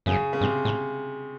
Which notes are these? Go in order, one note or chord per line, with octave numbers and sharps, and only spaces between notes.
F#2 C#3
C#3
G2 C3
A2